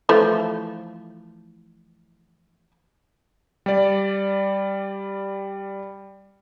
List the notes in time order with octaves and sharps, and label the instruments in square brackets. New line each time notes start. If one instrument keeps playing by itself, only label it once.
[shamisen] E3 F3 A3
[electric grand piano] G3 D5